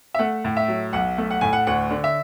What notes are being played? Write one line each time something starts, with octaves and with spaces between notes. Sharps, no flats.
E5
A3 F#5
A2
E5
F#3
B1 F#5
A3
F#5
A2 G#5
F#5
D2 F#5
D3
E5